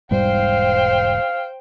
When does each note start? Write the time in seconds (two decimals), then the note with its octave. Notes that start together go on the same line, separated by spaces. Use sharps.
0.11 E1 G#2 G3 C5 F5 G5